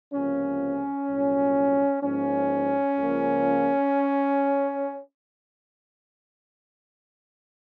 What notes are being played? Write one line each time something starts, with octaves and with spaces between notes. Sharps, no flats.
C#2 C3 F3 A#3 C#4
C2 A#2 F#3
G#2 F3 A#3 C#4
C#2 C#3 F3 A#3